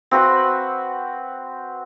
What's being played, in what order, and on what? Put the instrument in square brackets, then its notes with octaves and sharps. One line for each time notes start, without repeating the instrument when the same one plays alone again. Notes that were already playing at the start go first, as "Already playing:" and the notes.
[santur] C4 F#4 B4 F#5